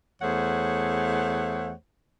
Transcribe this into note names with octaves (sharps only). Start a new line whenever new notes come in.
E2 A3 G#4 C5 C#5 F#5